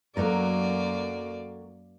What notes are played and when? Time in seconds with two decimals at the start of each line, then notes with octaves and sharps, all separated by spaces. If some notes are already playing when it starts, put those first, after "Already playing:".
0.17 F#2 F#3 A3 A#3 A#4 D5